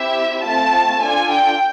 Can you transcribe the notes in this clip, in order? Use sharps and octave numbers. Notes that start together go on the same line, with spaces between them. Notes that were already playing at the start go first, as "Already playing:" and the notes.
Already playing: C4 E4 G4 E5
A3 C4 F4 A5
D4 F4 A4 G#5
G5